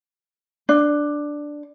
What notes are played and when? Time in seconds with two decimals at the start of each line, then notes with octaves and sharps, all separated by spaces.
0.69 D4